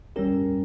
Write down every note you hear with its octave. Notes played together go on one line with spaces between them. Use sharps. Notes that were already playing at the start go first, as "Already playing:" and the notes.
G2 G3 C#4 G4 A#4